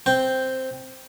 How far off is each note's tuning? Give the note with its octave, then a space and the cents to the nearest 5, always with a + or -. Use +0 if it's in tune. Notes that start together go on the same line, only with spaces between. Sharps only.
C4 +0 G5 +0